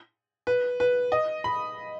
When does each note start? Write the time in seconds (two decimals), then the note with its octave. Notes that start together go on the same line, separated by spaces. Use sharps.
0.47 B4
0.80 B4
1.12 D#5
1.44 B5